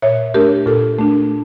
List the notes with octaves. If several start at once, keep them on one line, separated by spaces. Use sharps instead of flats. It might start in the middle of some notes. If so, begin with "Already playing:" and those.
A#2 C#5 E5
A3 D4 G4 A#4
A#2 F4 A4
A3 D4